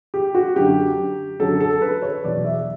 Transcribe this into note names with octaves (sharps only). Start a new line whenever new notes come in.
G4
F#4
F#2 D3 F#3 G4
F#2 D3 F#3 A4
A4
B4
C#5
E2 B2 F#3 D5
E5